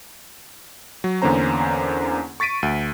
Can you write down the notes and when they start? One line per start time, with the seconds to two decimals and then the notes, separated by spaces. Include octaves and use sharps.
1.04 F#3
1.22 E2 D3 A#3 C#4 C5 A#5
2.40 C#6 A6 B6 D7 D#7
2.63 D2 D#7